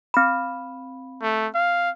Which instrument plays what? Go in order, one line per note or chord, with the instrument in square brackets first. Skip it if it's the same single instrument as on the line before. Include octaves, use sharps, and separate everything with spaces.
[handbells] C4 B5
[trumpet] A3
F5